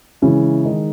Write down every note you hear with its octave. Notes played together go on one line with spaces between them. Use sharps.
C#3 E3 G#3 C#4 E4
D#3 G#3 D#4